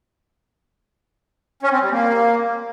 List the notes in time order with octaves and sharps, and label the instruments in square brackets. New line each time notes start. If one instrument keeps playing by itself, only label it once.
[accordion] C#4
C4
G3
A#3